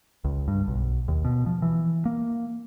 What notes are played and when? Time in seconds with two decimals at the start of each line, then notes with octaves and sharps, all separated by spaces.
0.24 C#2
0.48 G2
0.68 B1
1.08 D#2
1.25 B2
1.46 F3
1.62 E3
2.05 A#3